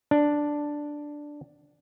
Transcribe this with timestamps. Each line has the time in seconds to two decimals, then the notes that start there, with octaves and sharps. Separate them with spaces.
0.11 D4